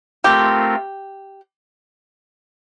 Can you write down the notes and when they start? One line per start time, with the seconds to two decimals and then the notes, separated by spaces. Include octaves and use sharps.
0.24 A3 C4 F4 G4 A#4